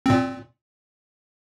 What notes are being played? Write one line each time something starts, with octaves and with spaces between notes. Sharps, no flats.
A#2 C4